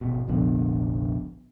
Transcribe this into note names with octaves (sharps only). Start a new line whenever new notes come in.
G#1 B2
F1 A#1 D3 F3 B3